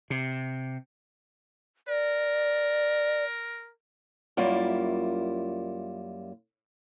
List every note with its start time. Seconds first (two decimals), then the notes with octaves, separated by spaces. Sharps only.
0.10 C3
1.88 A#4 D5
4.37 F#2 G3 A#3 E4 F4